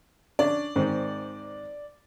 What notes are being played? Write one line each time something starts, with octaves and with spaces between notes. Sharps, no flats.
C#4 D4 D5
G#2 D#3 C4